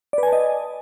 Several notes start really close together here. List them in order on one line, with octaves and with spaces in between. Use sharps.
D5 B4 G#5 A5 D#5